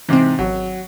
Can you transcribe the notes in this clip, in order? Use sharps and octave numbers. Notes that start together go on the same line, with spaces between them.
G#2 C3 E3 C4
G#1 F#3